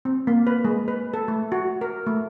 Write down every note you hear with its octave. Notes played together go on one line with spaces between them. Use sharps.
C4
A#3
B4
G#3
B4
A4
A3
F#4
A#4
A3